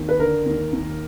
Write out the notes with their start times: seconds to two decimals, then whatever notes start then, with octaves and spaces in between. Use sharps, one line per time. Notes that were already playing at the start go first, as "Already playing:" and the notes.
Already playing: D#2
0.09 B4
0.19 D3 A#4
0.46 D#2
0.73 D#2